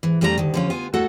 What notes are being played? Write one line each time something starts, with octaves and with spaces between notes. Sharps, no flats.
G#2 E3
F2 G3 A3 D4 G#4 A#5
D2 D#3
D3 F3 C#4
B3 F4 G#5
D#2 A2 A3 F#4 A4 F#5